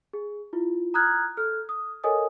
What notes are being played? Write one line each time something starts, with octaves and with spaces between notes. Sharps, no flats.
G#4
E4 F4
A#5 D#6 F6 F#6 G#6
A4 F6
D#6
A4 A#4 C#5 D#5 G#5 D#6